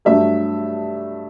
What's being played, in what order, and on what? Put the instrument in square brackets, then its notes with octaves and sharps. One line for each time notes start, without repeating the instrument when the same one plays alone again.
[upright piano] G2 F#3 A3 D4 E5